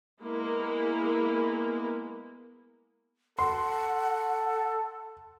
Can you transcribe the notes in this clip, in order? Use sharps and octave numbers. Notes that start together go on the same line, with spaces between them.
G#3 A#3 B3 E4 A#4
A4 F#5 C6